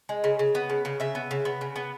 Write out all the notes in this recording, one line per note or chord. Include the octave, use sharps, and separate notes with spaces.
G#3
C#3
C#3
B3
C#3
C#3
C#3 E5
B3
C#3
B3
C#3
B3